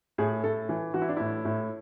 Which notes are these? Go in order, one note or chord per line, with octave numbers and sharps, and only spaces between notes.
A2 G#4
A2 A4
E3
E3 F#4
E4
D4
A2 E4
A2